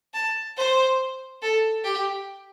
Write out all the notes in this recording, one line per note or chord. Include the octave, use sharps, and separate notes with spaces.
A5
C5
A4
G4